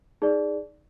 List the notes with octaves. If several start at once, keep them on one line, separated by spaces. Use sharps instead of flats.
D#4 G#4 D5